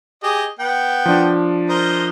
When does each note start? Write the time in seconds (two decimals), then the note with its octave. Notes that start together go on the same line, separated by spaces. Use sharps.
0.23 G4 G#4 D#5
0.59 B3 F#5 G5
1.06 F3 D4
1.69 A#4 C5 D#5